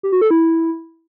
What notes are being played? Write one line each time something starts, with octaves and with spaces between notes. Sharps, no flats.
G4
F#4
A4
E4